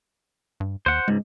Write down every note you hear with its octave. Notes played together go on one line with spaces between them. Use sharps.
G2
D#2 C5 F#5
C#2 G#2 G#3